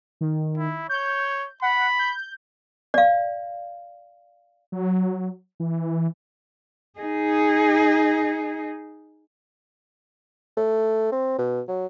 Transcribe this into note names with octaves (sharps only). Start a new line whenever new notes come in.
D#3
E4
C#5 G6
F#5 B5
G6
D5 F5
F#3
E3
D#4 G#4
A3
C4
B2
F#3